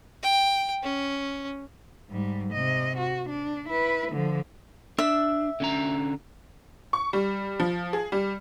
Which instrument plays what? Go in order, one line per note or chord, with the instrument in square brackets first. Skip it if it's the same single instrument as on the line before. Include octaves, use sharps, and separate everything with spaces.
[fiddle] G5
C#4
[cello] G#2 G3
C3 D#5
F#4
D4
E4 B4
D3 F3
[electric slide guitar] D4 [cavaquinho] E5
[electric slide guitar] D3 C#4 A#5
[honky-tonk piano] C#6
G3
F3
G#4
G3